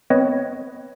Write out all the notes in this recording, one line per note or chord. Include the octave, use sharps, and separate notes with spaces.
B3 C4 B4 C#5 D#5